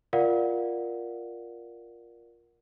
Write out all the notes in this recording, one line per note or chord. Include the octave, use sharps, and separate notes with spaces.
F4 A#4 D5 F5 F#5